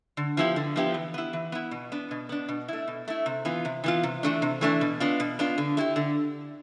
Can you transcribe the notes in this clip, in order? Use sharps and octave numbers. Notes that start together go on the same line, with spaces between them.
D3
F3 B3 E4 G4
D3
F3 B3 E4 G4
E3
B3 E4
E3
B3 E4
B2
B3 D4
B2
B3 D4
B2
A3 E4
B2
A3 E4
C3
E3 B3 F4
C3
E3 B3 F4
C3
E3 A3 D4
C3
E3 A3 D4
B2
B3 D4 F4
B2
B3 D4 F4
D3
A3 E4 G4
D3